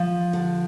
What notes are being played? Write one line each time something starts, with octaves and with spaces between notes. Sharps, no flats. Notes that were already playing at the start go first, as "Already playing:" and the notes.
Already playing: F3
D3